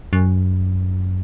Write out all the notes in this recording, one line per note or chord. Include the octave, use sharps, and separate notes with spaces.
F#2